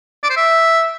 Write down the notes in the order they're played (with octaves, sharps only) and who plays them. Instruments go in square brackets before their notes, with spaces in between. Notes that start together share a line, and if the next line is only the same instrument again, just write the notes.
[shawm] D5
C5
E5